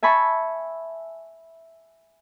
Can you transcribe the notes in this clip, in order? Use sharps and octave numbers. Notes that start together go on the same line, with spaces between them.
E5 G#5 A5 B5 C#6